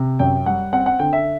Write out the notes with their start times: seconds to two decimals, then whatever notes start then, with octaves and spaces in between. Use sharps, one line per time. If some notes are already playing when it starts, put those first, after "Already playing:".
Already playing: C3
0.19 F#2 G5
0.46 G3 F#5
0.73 C4 F#5
0.86 F#5
0.99 D3 G5
1.13 E5